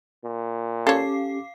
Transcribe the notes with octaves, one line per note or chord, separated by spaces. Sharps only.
A#2
C#4 G4 A4 C#5 F5 D6 C7